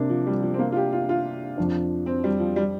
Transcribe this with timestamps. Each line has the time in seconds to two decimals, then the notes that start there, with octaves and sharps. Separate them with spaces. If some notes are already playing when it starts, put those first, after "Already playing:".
Already playing: C3 A#3 D4
0.10 F3
0.27 G3
0.42 F3
0.54 C4
0.59 A#3
0.72 F4
0.76 G4
0.92 F4
1.09 F4
1.58 F2 F3 D4
2.06 C4
2.24 G3
2.39 F3
2.56 G3